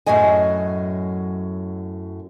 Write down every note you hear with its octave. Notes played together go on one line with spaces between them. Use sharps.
F#2 A2 F#3 D#5 G#5